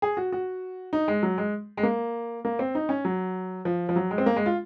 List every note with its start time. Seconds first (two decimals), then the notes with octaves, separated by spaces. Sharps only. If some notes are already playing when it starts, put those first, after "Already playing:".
0.02 G#4
0.17 F#4
0.32 F#4
0.93 D#4
1.08 G#3
1.23 F#3
1.38 G#3
1.77 G#3
1.83 A#3
2.45 A#3
2.59 C4
2.75 D#4
2.89 C#4
3.05 F#3
3.65 F3
3.89 F3
3.96 F#3
4.11 G#3
4.18 C4
4.26 A#3
4.36 G#3
4.46 F4